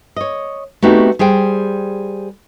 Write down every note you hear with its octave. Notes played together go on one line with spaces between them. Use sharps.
C#5 D#5
A3 B3 C4 D#4 F#4 G4
G3 G#4 C5 G5